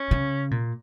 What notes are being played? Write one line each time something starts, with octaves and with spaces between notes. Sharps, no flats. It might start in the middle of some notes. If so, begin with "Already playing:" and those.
Already playing: C#4
C#3
A#2